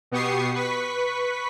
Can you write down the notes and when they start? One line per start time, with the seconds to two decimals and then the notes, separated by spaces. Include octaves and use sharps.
0.11 B2 B3 G4 C#6 D#6 C7
0.55 B4 C#6 B6